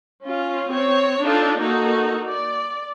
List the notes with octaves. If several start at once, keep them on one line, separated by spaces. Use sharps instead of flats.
C#4 F4
C4 C#5
D4 D#4 F4 A4
A#3 D#4 F#4 A4
D5